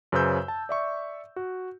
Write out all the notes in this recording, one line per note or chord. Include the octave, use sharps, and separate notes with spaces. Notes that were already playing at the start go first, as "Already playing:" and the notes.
F#2 C#3 B4 C5 E6 G6
A5
D5 E5 C#6
F#4